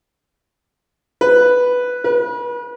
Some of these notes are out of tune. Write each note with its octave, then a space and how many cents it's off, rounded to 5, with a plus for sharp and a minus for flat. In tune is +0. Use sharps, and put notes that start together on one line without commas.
B4 +0
B4 -35